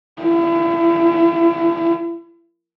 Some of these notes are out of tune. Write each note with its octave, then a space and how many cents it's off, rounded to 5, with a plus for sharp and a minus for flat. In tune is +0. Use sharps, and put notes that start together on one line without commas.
E4 +35